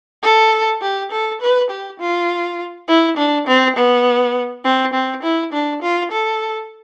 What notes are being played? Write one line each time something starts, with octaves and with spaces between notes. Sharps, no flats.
A4
G4
A4
B4
G4
F4
E4
D4
C4
B3
C4
C4
E4
D4
F4
A4